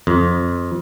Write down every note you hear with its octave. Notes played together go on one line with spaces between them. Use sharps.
F2